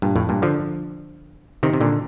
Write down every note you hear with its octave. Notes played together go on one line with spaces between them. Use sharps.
G2 A#2
F2 A2
G2 A#2
D3 F3
C3 D#3
C3
A#2 D3